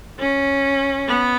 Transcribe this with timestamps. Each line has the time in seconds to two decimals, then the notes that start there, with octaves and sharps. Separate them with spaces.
0.19 C#4
1.08 B3